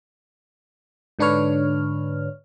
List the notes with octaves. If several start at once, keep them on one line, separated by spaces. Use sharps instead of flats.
G#2 D3 D4 B4 C#5 F6